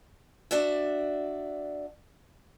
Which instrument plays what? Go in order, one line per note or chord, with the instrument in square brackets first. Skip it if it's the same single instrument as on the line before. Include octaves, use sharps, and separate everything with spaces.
[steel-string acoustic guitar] D4 F#4 D5 E5